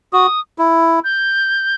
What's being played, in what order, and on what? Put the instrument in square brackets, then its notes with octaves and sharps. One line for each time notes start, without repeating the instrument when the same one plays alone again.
[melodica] F#4 [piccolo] D#6
[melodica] E4
[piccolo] G6